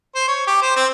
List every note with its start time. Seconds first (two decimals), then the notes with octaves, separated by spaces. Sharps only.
0.15 C5
0.28 C#5
0.47 G4
0.62 C5
0.77 C4